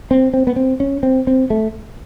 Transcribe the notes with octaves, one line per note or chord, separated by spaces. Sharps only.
C4
C4
B3
C4
C#4
C4
C4
A3